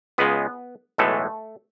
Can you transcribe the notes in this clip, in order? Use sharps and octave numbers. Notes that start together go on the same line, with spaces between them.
C#2 C#3 G#3 B3 B4
B1 A2 E3 G#3 A3 A4